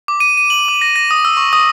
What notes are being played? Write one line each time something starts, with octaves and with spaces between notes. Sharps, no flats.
D6
D#7
D#7
F#7
D6
A#6
A#6
D#6
E6
C#6
D#6